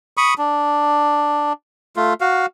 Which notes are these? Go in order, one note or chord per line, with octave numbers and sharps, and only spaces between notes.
B5 C#6 D#6
D4
A3 F4
F#4 F5